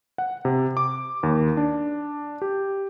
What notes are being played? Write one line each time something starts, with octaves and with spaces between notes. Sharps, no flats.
F#5
C3
D6
D#2
D4
G4